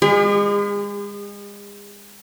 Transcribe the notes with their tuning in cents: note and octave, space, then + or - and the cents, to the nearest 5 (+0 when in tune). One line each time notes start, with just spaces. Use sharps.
G#3 -35 G4 +45